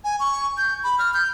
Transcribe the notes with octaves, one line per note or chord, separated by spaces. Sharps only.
G#5
C#6
G6
B5
F6
G6